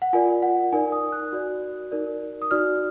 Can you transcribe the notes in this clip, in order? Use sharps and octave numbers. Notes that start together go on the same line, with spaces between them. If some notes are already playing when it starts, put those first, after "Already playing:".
F#5
F4 A#4 D5 G#5
F#5
D#4 A#4 D5 G#5
D#6
F#6
F#4 D5
D#4 A#4 D5
D#6
D#4 F#4 D5 F6